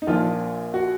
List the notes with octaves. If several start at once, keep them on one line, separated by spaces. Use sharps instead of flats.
D#4
A#1 A#2 F3 F4
F#4